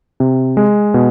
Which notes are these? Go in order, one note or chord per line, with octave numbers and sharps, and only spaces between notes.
C3
G#3
B2